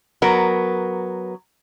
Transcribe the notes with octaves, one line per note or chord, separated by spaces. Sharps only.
F#3 B3 A#4